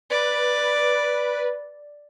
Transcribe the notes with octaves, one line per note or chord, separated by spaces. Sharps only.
B4 D5